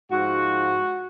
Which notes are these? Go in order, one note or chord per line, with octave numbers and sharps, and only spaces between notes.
G#2 F3 F#4